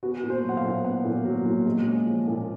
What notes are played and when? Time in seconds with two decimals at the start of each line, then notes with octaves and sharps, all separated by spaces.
0.03 B3 F#4
0.23 A#2
0.30 C5
0.44 F#3
0.49 F#5
0.57 F5
0.63 A#2
0.84 B3 F#5
1.05 A#2
1.25 F#3
1.46 A#2
1.65 G#3
1.86 C#4
2.06 F3
2.27 A#2